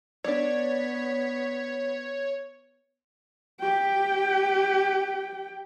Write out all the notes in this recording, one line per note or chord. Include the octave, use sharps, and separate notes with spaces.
B3 D4 C#5 D5
G4 G5